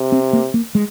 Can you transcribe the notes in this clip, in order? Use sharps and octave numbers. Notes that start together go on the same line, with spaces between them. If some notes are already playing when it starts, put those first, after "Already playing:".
Already playing: C3
C4
A#3
A#3
G#3